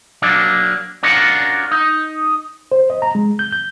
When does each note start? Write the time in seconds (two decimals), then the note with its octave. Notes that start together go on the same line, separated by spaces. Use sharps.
0.22 F#3 A#3 D4
1.03 C#4 D4 F4 F#4 A#4 C#5
1.71 D#4
2.72 C5
2.90 D#5
3.02 A#5
3.15 G#3
3.39 G6
3.53 G6